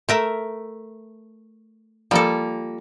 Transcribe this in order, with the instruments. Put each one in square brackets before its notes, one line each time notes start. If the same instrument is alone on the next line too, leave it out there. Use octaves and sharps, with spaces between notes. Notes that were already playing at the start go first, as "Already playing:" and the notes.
[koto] A3 A#4 E5
[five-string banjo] F3 A#3 [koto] G3 A4